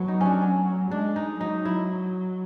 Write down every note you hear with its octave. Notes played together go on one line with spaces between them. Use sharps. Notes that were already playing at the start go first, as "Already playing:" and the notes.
Already playing: F#3 A3 B3
D#4
C#4 D4
C#4
G#3 D4
D#4
F#3 D#4
E4